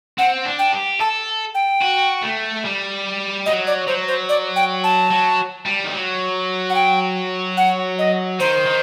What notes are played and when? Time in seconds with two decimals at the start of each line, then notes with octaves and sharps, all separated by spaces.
0.18 C4 F#5
0.45 D4
0.59 G5
0.73 G4
1.00 A4 A5
1.55 G5
1.82 F#4
2.23 A3
2.65 G3
3.46 F#3 D#5
3.67 D5
3.87 F#3 C5
4.08 C5
4.29 D5
4.56 G5
4.84 A5
5.10 F#3
5.66 G3
5.84 D#3
5.92 F#3
6.70 F#5
6.75 G5
7.57 F#5
7.98 D#5
8.39 D#3 C5
8.66 D#3